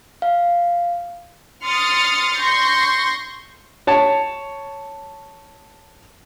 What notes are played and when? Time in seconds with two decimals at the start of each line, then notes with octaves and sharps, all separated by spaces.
0.22 F5
1.63 C6 D#6 F6 A6 C#7
2.39 C6 C#6 G6 A#6
3.87 C#5 A5